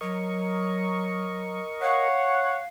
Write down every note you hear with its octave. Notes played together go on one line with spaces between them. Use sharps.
F#3 A#4 D#5 C#6
C#5 F5 F#5